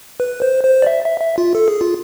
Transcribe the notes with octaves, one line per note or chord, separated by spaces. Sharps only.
B4
C5
C5
D5
E5
E5
E5
F4
A4
G#4
F4